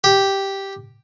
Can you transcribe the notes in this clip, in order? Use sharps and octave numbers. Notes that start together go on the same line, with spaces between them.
G4